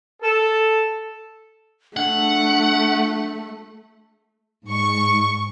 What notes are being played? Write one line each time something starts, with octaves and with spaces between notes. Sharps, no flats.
A4
A3 D4 F#5
G#2 C#6